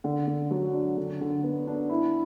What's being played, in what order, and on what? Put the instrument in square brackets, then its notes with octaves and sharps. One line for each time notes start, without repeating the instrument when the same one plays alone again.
[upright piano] D3
D3
F#3
D4
D3
D3
B3
D4
E4